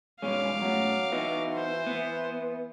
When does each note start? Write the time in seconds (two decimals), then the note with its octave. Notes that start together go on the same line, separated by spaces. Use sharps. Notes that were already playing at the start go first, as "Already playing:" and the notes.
0.22 G2 B2 G#3 C#4 F5 D6
0.62 F#2 A2 F#3
1.12 E3 B3 D#4 F#4
1.55 C5
1.87 B3